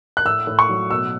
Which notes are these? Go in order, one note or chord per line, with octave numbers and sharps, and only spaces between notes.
F#6
A2 E6
A2
C#6
F#3
B2 E6